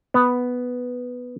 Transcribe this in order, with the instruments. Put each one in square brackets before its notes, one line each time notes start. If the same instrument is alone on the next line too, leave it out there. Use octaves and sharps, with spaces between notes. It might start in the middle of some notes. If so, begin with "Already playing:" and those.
[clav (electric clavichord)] B3